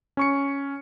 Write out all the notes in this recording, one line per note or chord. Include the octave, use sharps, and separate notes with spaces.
C#4 C#6 C#7